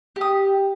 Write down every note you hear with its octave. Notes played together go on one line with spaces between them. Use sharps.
G4 D#6